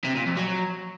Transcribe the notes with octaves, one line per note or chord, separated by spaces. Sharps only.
C3
A#2
F2
F#3